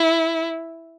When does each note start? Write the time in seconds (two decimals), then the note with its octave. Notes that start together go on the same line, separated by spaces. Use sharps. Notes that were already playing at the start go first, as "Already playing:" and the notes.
Already playing: E4